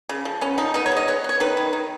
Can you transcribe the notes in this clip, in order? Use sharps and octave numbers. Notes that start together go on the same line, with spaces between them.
C#3
F3
B3 C#4
F3 D#4
B3 D#4
C#5
G#3 D#5
B3 C#5
B3 C#5
D#3 B4
D#3
D#3